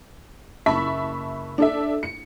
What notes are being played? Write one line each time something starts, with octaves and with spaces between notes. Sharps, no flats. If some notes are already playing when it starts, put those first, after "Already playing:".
F#1 E5 A5 B5 C#6 B6
D4 A4 E5
C#7